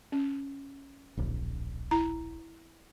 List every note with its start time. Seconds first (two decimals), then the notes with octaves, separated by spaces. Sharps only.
0.12 C#4
1.17 D1 A#1
1.91 E4 A#5